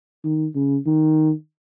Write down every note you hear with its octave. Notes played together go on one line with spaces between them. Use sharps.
D#3
C#3
D#3